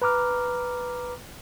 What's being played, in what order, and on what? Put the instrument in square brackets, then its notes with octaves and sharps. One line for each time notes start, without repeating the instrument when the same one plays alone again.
[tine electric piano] B4 A#5 D6 F6